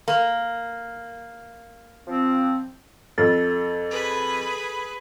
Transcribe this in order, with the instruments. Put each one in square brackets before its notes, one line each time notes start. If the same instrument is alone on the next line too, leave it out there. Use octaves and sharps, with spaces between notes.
[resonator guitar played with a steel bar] A#3
[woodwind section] F3 C4
[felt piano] F2 [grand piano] A4 [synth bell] A6
[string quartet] G#4 B4 B5